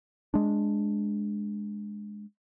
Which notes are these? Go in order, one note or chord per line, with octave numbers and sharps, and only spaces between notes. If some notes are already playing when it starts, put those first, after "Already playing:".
G#3 D4